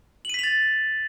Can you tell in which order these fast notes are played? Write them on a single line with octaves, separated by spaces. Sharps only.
F#7 D#7 B6 F7 A6